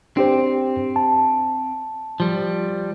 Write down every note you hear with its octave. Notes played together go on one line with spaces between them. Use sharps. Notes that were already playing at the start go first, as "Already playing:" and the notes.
C4 D4 G4 C5
A5
F3 G3